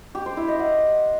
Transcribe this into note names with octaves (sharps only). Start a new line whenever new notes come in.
G4
C5
E4
D#5
F#5